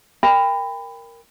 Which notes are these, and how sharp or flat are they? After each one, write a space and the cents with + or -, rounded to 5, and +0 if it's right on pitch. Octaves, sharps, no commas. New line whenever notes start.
A#4 +0 G5 +30 B5 +20